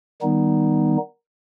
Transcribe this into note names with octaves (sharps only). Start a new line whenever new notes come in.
D#3 G3 B3 D#4